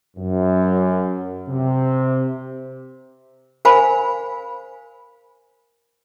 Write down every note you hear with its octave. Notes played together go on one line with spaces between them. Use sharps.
F#2
C3
A#4 C5 F5 G#5 B5